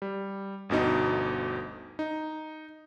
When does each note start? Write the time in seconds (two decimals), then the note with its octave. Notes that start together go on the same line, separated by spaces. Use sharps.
0.02 G3
0.69 G1 D2 B2 D#4
1.99 D#4